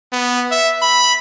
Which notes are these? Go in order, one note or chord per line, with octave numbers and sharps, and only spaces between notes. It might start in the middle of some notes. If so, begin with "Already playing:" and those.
B3
E5
B5